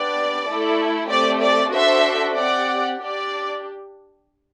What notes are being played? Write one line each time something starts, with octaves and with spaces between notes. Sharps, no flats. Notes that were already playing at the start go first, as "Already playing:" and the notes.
Already playing: B3 D4 G4 D5
A3 E4 A4
A3 C4 G4 D5
D5
D4 F#4 A4 C5 E5
C4 G4 D5 F#5
D4 G4 D5